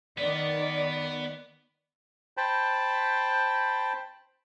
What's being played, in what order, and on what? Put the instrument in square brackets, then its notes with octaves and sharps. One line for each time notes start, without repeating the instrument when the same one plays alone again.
[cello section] D#3 D5 [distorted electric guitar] B3
[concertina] C5 G5 A5 B5